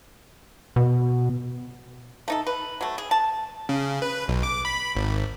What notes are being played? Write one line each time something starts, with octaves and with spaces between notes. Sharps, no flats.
B2
A3 D#4 A4
B4
F#3 A3
G#4
A5
C#3
B4
B1
D6
B5
G#1